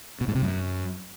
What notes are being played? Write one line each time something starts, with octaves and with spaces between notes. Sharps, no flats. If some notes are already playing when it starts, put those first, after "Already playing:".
B2
G#2
C3
F#2